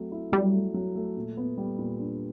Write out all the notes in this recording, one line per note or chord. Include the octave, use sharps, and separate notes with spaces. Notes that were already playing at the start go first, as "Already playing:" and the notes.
Already playing: F#3 A3 C4
E4
F#3 G3
A3
F#3
A3
A#2
B3
G3
A#2
D4